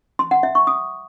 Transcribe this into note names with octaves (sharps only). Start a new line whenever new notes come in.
C6
F#5
E5
C#6
D#6